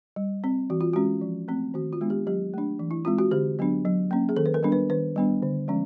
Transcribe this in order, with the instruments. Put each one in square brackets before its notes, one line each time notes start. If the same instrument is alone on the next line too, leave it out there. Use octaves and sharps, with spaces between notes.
[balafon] G3
C4
E3 F#4
F4
G#3 C#4 F#4
F3
A3 C4
D#3 F#4
F4
G#3 B3 D4
G4
F#3 G4
A3 D4
E3
E4
G#3 C4 F4
F#4
D3 G4
F#3 B3 D4
F#3
A#3 C#4
G#4
D#3 A4
B4
A#4
G3 B3 D4
B4
D#3 B4
G3 B3 D4
D3
F3 G#3 C#4